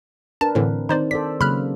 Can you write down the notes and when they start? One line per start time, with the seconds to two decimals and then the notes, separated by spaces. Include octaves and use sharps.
0.41 D4 A#4 B4 A5
0.55 A2 D3 E3 C4
0.89 D#3 C4 D#4 C5 D5
1.11 A4 C5 D5 B6
1.41 C#3 F#3 A#3 B5 F6 F#6